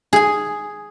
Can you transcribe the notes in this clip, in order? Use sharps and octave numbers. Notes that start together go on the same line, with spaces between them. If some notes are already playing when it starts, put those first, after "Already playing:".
G#4 G#5